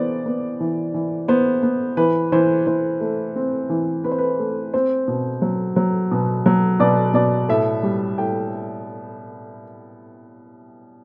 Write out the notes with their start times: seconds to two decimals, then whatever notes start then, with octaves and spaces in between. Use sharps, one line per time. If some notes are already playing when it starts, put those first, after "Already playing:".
Already playing: E3 B3 C5 D5
0.26 B3
0.60 E3
0.94 E3
1.28 B3 C5
1.63 B3
1.97 E3 B4
2.32 E3 C5
2.67 E3 C5
3.00 A3
3.36 C4
3.70 E3
4.04 C4 B4
4.11 C5
4.18 B4
4.39 A3
4.74 C4 C5
5.08 B2
5.42 F#3
5.76 F#3
6.11 B2
6.46 F#3
6.80 B2 D5
7.14 B2 D5
7.49 A2 E5
7.83 G3
8.18 A2 G5